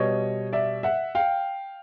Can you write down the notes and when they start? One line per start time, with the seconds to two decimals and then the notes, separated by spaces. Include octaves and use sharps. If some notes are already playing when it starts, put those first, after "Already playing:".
Already playing: B2 G3 C#5 D#5
0.53 D5 E5
0.83 E5 F#5
1.15 F5 G5